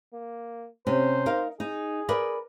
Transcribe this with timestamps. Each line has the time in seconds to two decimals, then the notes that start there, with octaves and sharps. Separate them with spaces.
0.13 A#3
0.87 C3 C#4 C5
1.26 D#4 A#4 F5
1.60 D#4 G#4
2.09 A#4 B4 D5